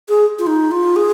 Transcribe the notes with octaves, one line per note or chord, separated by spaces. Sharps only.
G#4
F4
D#4
F4
G#4